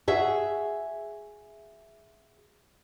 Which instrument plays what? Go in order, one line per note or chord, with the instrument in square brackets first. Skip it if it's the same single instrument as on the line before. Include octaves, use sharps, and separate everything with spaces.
[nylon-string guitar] F#4 G#4 E5